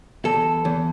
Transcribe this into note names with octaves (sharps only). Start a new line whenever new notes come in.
E2 A4
E2